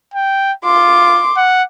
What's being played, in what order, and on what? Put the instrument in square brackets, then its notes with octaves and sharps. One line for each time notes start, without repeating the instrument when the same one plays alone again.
[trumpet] G5
[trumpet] F4 [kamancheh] C6 D6
[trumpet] F#5